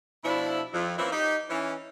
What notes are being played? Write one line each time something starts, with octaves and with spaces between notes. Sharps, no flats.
B2 F3 D4 E4
F2
E3 A#3 C4 C#4 E4
D#4 G4
E3 C#4